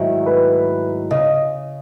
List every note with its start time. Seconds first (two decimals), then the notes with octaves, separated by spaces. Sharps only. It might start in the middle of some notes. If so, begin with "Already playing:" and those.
Already playing: G#2 D#3 F#3 A3 E4
0.26 B4
1.11 C#3 D#5